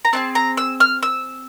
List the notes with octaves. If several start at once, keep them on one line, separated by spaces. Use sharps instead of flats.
A#5
C4 D#4 G#4 A5
A#5
E6
F6
E6